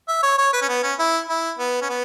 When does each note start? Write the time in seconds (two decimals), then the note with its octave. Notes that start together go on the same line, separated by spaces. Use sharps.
0.08 E5
0.23 C#5
0.38 C#5
0.53 B4
0.62 C#4
0.69 B3
0.83 C#4
0.99 E4
1.29 E4
1.59 B3
1.82 C#4
1.89 B3